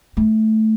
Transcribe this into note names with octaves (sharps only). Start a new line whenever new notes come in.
A3